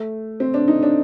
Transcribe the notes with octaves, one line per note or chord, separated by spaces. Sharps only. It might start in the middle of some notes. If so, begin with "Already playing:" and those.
Already playing: A3
C4
D4
D#4
D4